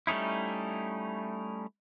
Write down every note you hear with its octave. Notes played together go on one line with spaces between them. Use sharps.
G3 A3 C#4 D#4 E4